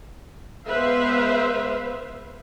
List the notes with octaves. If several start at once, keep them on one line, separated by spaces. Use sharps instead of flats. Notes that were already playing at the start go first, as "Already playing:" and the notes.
G#3 B3 B4 C5 E5 F5